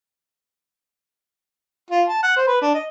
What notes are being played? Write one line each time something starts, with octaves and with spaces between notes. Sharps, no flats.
F4
A5
F#5
C5
B4
D4
D#5